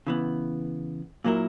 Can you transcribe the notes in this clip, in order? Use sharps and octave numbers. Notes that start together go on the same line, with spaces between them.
C#3 E3 B3
A#2 F#3 A#3 E4 A#4